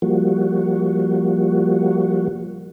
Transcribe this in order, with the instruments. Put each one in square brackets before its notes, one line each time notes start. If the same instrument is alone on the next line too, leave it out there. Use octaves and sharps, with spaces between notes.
[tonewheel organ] F3 G3 A#3 F#4